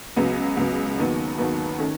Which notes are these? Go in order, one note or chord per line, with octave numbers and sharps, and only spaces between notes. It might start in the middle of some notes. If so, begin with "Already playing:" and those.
C#2 C#3 F#3 B3
C#2 C#3 F#3 B3
D#2 D#3 F#3 B3
D#2 D#3 F#3 B3
D#3 A3 C#4